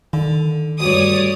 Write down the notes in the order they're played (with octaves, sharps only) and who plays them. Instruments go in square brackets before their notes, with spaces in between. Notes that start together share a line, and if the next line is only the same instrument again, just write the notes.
[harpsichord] D3 [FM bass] D#3
[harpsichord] D2 G2 [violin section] C#5 D5 D#6